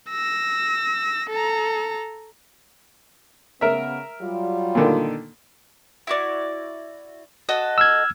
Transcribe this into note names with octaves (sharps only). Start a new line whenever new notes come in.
E6 A#6
A4 A#5
C#3 B3 A#4 E5
F#3 G3 F4
A#2 D3 D#3
E4 F#4 D5
F#4 A4 D#5
E6 F6 G#6